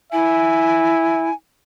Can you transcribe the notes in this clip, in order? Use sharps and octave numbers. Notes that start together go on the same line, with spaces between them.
E4 E5 G#5